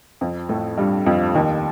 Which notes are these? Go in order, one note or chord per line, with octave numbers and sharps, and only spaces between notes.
F2 F3
A2 A3
G2 G3
F2 F3
D#2 D#3